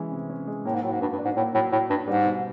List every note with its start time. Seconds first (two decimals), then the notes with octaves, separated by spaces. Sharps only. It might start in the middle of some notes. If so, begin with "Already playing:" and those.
Already playing: E3 G#3 C#4
0.12 C3
0.29 C#4
0.47 G#3
0.65 A2 A#3
0.74 G#2
0.83 A2 F#3
0.91 G#2
1.01 G2 F#4
1.13 G2
1.18 D4
1.25 G#2
1.36 A2 A#3
1.54 A2 F#3
1.72 A2 F#4
1.90 G2 D4
2.08 G#2 G3
2.26 B2